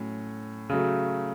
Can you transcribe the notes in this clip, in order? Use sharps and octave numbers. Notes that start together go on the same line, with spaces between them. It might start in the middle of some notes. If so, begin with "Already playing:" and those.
Already playing: A2 F#3 C#4
C#3 F#3 A3